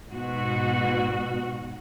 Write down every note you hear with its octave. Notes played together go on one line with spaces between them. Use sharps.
G#2 B2 F#4